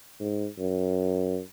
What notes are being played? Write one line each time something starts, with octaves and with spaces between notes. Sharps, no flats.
G#2
F#2